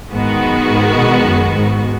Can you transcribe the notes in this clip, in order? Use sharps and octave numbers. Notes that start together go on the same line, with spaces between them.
G#2 D#3 G#3 B3 F#4
F#2
G#2
B2
F#2
G#2